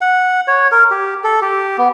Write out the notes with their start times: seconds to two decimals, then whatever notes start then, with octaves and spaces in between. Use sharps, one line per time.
0.01 F#5
0.48 C#5
0.72 A#4
0.91 G4
1.24 A4
1.41 G4
1.78 B3